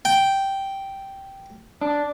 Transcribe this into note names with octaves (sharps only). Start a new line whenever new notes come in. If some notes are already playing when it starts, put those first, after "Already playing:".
G5
D4